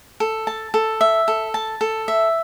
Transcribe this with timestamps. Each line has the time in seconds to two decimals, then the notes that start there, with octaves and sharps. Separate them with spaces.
0.20 A4
0.47 A5
0.74 A4
1.01 E5
1.28 A4
1.54 A5
1.81 A4
2.08 E5